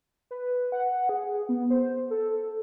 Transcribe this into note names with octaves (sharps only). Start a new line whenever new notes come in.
B4
F#5
G#4
B3
C5
A4